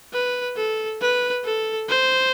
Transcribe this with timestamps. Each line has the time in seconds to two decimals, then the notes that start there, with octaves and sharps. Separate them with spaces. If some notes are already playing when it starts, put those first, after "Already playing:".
0.13 B4
0.57 A4
1.01 B4
1.45 A4
1.89 C5